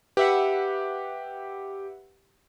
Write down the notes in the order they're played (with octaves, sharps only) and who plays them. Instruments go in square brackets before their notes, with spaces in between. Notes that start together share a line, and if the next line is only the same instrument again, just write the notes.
[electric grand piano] G4 [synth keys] B4 E5 F#5